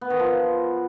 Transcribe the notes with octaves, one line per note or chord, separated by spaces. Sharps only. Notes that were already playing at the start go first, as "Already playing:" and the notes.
B3
D#3
F3